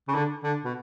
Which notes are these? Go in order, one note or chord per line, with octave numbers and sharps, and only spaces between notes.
C#3
D3
D3
B2